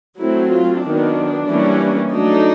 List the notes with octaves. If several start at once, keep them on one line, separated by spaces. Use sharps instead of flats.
F#3 A3 C4 E4
F4
D#3 F#3 B3 D4
E3 G3 A#3 C#4
F#3 A3 D4 D#4